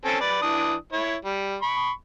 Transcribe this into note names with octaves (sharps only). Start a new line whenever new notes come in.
C4 C#4 A4
B4 D5
E3 D4 D#6
E4 C#5
G3
B5 C#6